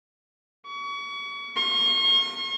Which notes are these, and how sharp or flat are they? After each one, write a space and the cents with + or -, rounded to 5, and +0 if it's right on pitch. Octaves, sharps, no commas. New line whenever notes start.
C#6 +35
C#6 -45